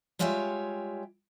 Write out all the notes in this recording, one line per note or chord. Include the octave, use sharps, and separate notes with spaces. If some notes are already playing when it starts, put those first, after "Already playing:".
G3 G#3 F4 G4 C#5 E5